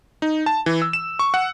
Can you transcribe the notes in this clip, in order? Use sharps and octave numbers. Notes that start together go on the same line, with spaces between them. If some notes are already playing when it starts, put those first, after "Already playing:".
D#4
A5
E3
E6
E7
C#6
F#5